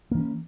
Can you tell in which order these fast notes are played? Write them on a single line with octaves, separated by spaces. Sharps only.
A#3 E3 C#4